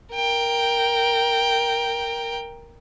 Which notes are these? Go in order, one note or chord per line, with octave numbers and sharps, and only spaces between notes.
A#4 G5